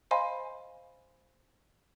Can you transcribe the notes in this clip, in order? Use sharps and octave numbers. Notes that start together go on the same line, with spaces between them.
C5 D#5 F5 G#5 B5 C6